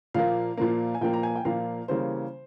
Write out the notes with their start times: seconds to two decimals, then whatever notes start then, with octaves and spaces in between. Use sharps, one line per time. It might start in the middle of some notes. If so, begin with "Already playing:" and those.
0.14 A#2 F3 A#3 F5
0.57 A#2 F3 A#3
0.94 G#5
1.01 A#2 F3 A#3 G5
1.13 A#5
1.23 G#5
1.36 G5
1.45 A#2 F3 A#3 F5
1.88 C#3 E3 G3 A#3 C5